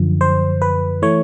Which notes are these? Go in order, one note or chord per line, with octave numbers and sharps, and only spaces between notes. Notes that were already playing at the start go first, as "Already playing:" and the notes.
Already playing: F#2 D3 F3
C5
B4
E3 A3 C#5